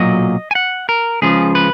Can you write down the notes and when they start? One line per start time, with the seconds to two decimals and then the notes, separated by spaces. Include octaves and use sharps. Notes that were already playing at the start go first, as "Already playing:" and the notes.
Already playing: B1 A#2 F#3 D#5
0.51 G#5
0.55 F#5
0.89 A#4
1.22 C#2 C#3 F3 G#4
1.55 B4